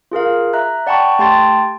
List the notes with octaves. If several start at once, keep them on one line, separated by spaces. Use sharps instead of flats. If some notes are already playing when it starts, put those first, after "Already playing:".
F4 G#4 A#4 F5
E5 A#5 F#6
D5 F#5 G5 A5 B5 C#6
A3 G4 G5 A5 C6 A6